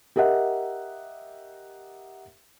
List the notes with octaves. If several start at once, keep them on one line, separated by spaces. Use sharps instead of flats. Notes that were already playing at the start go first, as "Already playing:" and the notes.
G4 A#4 D#5 E5 F#5